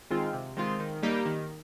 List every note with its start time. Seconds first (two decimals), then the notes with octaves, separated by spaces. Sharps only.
0.10 D#3 G#3 C4 F4
0.33 C3
0.57 D#3 G#3 C4 F4
0.80 D#3
1.02 G3 A#3 D#4 G4
1.25 D#3